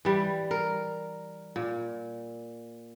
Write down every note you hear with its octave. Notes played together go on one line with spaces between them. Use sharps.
E3 G3
A#4
A#2